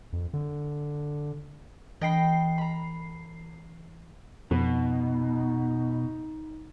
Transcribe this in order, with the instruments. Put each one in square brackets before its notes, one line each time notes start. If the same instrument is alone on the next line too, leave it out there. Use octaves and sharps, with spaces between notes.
[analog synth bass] F2
D3
[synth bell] E3 C7 [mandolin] D#5 G5 B5
[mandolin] A#5 B5
[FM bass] F2 [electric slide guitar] B2 [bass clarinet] D#4